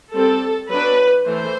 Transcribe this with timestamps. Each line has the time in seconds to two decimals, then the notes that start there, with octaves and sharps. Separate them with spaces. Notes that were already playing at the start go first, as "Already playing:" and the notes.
0.13 G3 C4 A4
0.69 F#3 B3 D4 B4
1.26 E3 A3 C5